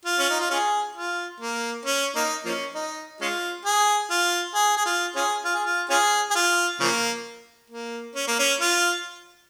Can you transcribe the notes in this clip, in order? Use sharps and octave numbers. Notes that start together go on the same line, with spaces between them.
F4
C#4
D#4
F4
C#4 F4 G#4
F4
A#3
C#4
A#3 D#4
F3 A#3 C#4
D#4
G#3 C#4 F4
G#4
F4
G#4
G#4
F4
C#4 F4 G#4
F4
G#4
F4
C#4 F4 G#4
G#4
F4
C#3 F3 A#3
A#3
C#4
A#3
C#4
F4